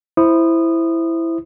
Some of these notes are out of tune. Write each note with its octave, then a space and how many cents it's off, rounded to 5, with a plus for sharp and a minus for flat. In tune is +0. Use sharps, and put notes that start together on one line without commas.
E4 +5 C5 +0 D#6 -20